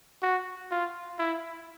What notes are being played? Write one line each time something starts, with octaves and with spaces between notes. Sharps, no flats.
F#4
F4
E4